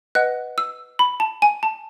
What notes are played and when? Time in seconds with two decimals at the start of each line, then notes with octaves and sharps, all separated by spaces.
0.15 B4 D#5 F#5 F#6
0.58 E6
0.99 B5
1.20 A5
1.42 G#5
1.63 A5